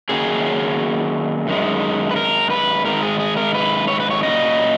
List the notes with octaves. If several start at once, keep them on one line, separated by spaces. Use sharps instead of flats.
D#3 F#3 A#3 C#4 G#4
F#2 D#3 G#3
B4
A#4
B4
G#2 D#3 G#3 A#4
G#4
G#4
A#4
B4
C#5
B4
C#5
A#2 F#3 C#4 D#5